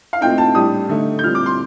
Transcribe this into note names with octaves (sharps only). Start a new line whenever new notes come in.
F5
A#2 A3 C4 D#4 G5
A5
A2 G3 D4 D#6
D3 A3 D#4
G6
A#2 G3 C4 F6
D6
C6